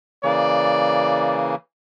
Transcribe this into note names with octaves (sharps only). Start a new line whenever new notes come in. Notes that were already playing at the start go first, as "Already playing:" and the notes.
C#3 E3 A#3 D5